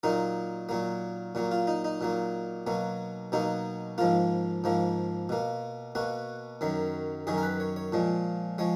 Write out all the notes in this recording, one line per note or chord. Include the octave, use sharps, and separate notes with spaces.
A#2 F#3 A#3 D#4
A#2 F#3 A#3
A#2 F#3 A#3
F4
D#4
D#4
A#2 F#3 A#3
B2 F#3 A#3
B2 F#3 A#3 D#4
G#2 F3 A#3 F4
G#2 F3 A#3
B2 A#3
B2 A#3 F#4
F#2 D#3 F#3
F#2 D#3 F#3 G#4
A#4
B4
C#5
C#5
A#2 F3 G#3
F3 G#3 C#5